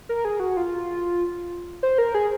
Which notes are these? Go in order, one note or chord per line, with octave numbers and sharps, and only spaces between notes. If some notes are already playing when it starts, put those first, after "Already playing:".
A#4
G#4
F#4
F4
C5
A#4
G#4